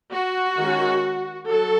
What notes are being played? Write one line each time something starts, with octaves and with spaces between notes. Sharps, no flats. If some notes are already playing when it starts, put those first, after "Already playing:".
F#4
D#3 G#3 C#4
F#3 A4